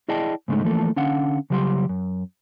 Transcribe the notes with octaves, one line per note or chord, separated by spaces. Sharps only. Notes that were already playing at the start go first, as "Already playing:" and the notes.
E4 G#4 D5 D#5 G5 A5
G#2 C#3 G#3 A3 D#4
E3 F3 A3 A#3 A4
D3 C#4 F5 F#5
C#3 F#3 G3 G4 E5 C6
F#2